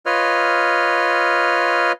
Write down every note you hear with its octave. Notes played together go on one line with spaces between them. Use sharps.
F4 B4 C#5 D#5 F6